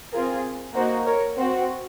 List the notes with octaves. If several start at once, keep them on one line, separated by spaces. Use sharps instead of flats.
C4 F4 G#4 A#4
A#3 D#4 F#4 C5
A#4 C#5
C4 F#4 C5